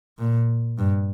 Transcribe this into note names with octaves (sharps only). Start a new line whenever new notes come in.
A#2
G2